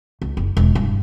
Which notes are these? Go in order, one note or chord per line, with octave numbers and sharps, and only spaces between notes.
C#2
F#1
E1
G2